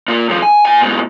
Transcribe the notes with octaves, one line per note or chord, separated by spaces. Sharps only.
A#2 A#3
D#2 F3
G#5
A#2 G#5
G#2 B2